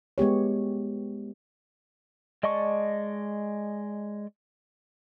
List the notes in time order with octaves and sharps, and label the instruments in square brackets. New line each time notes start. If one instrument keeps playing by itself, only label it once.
[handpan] G#3 B3 G4 C#5
[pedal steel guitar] G#3 D5 D#5 A5 C#6